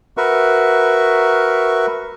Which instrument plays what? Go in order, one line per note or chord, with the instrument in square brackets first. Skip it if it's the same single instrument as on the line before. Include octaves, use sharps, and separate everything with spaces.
[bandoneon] F#4 A#4 B4 E5 C#6